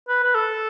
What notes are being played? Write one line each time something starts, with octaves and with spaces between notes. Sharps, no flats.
B4
B4
A4